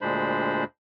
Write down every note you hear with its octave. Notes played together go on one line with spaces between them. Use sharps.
D2 A#2 G#3 D4 C5 B5